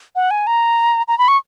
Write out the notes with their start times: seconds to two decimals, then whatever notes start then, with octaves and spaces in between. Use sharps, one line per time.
0.16 F#5
0.31 G#5
0.47 A#5
1.08 A#5
1.18 B5
1.28 C#6